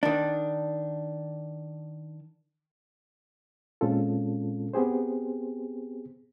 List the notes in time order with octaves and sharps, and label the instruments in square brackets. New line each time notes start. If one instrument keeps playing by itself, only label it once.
[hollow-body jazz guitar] D#3 D4
[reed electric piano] A#2 G#3 C4 C#4 F4 A4
B3 C4 G4 G#4 C5